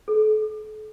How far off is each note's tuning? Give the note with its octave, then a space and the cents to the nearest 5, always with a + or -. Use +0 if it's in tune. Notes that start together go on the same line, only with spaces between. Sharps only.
A4 -40